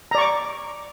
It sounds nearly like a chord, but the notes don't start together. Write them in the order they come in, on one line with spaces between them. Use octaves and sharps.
A#5 D5 C#6 D6